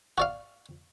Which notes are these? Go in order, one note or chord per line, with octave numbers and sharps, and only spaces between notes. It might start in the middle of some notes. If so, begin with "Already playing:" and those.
F#4 D5 F5